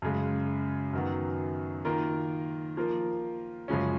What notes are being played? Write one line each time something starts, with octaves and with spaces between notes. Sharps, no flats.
F#2 C#3 G#3
F#2 D#3 F#3 B3 F#4
D#3 A#3 F4 A#4
F3 A#3 F4 A#4
F#2 C#3 F3 G#3 C#4